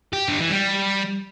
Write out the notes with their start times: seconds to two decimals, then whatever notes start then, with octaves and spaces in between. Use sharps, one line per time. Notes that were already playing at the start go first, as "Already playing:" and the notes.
0.13 G4
0.28 D3
0.39 E3
0.50 G3